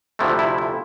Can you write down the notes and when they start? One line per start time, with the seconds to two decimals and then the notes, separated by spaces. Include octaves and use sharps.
0.19 D2 C3 F3 A3 E4
0.39 E4
0.58 E4